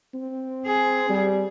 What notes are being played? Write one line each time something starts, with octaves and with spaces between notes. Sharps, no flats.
C4
G#4
G3